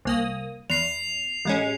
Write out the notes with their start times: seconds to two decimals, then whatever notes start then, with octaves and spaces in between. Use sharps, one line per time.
0.05 C2 A#3 D#6
0.70 E2 C7 F7
1.45 A1 G#3 C#4